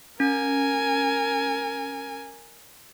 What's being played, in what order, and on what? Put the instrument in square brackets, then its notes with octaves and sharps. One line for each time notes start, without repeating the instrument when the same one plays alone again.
[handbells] C#4 [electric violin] A#4 G#5